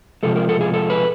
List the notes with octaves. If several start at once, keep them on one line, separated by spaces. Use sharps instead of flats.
C3 F3 G#3 A4
A#4
A4
G#4
A4
B4